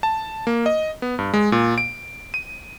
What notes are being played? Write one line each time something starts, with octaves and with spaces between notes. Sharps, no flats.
A5
A#3
D#5
B3
G2
G#3
A#2
D7
D#7